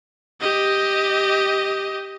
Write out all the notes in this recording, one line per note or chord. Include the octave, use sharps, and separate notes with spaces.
G4 D#5